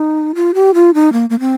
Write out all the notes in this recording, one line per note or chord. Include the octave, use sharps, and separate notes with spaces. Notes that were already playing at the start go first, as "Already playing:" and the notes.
Already playing: D#4
F4
G4
F4
D#4
A#3
A#3
C4